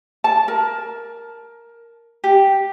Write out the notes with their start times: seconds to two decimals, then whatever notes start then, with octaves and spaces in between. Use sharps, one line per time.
0.24 A5
0.48 A#4
2.24 G4